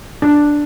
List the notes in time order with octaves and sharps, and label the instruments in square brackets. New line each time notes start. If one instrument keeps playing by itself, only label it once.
[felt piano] D4